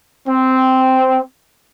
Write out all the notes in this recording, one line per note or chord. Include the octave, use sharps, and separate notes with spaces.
C4